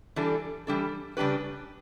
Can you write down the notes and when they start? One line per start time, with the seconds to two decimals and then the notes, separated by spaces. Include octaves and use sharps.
0.16 E3 G3 D4 A4
0.67 E3 G3 D4 A4
1.17 C#3 G3 D4 G4 B4